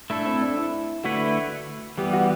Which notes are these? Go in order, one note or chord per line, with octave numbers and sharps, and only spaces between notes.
A3 D4 E4 A4
C4
D4
E4
D3 A3 E4 F#4 B4
E3 G3 B3 G4
F#4